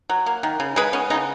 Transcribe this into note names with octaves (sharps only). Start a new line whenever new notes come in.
F#3
A#3
D#3
C#3
G#3 G#4 B4
B3 C#4
C#3 D#4